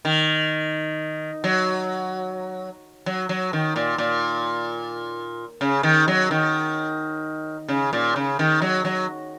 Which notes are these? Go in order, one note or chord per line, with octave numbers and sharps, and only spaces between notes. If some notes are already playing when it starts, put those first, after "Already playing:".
D#3
F#3
F#3
F#3
D#3
A#2
A#2
C#3
D#3
F#3
D#3
C#3
A#2
C#3
D#3
F#3
F#3